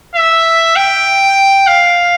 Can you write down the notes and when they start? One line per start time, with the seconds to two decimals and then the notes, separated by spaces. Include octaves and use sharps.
0.15 E5
0.76 G5
1.67 F5